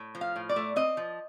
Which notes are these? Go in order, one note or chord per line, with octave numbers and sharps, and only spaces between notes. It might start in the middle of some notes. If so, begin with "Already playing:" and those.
Already playing: A2
F3
F5
A2
D5
A3
C4 D#5
F3